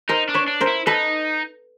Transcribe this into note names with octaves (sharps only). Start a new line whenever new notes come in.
D#4 A#4 C5
D4
B4 C#5
D4
A#4 C5
E4
D#4 A4 B4